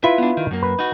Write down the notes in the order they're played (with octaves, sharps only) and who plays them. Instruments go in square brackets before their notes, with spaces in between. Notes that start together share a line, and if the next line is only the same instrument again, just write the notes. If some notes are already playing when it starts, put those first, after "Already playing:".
[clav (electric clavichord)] E4 F4 B4 [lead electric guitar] E5
[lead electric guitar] B3 D4
D#3
F#2 A#3
[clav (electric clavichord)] B4
[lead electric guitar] D#4 F#4